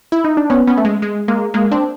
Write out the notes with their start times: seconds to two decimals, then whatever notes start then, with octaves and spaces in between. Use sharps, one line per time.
0.12 E4
0.24 D#4
0.37 D4
0.50 B3 C#4
0.67 B3 C#4
0.78 A3
0.85 G#3
1.02 G#3
1.28 G#3 A#3
1.54 G#3 A#3
1.71 C4 D4